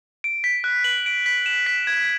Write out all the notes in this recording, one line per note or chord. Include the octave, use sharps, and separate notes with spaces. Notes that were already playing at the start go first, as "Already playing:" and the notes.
D7
B6
F#6
F#7
D7
B6
E7
B6
G#6